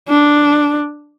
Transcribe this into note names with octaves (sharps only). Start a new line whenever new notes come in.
D4